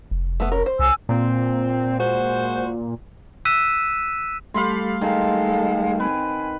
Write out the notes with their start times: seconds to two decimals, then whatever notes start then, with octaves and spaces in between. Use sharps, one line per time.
0.11 F1
0.40 A3 B3
0.52 C#4 A#4
0.66 C5
0.79 C2 G#5 E6
1.09 A#2 C4
1.98 G#3 F#4 C5
3.45 E6 F#6 B6 D#7 E7
4.54 G3 A3 G4 A4 F5 B5 C6
5.01 D#3 G#3 A4 F5
6.00 C4 B4 G#5